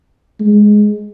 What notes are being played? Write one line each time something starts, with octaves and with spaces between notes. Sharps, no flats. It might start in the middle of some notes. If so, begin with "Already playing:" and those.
G#3